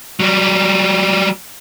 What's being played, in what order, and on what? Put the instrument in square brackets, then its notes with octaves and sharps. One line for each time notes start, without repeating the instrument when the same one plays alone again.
[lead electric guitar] F#3 G3